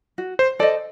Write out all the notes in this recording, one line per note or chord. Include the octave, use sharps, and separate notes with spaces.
F#4
C5
A4 C5 D5 D#5